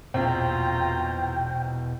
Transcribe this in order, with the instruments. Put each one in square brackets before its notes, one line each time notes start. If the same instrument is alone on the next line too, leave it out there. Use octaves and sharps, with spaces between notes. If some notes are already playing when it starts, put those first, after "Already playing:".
[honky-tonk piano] A#1 C4 [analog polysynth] E2 B2 [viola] F4 A#5 [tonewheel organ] G5